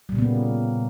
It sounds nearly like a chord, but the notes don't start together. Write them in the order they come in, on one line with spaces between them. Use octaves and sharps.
G3 A#2 C#3 B3 A#3